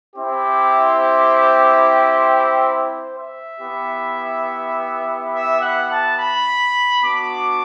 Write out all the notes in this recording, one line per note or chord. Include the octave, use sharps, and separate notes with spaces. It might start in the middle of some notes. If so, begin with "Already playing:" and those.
C4 E4 G4 C5
C5
E5
B3 E4 G4
E5
F#5
A5
B5
B3 D4 F#4 D6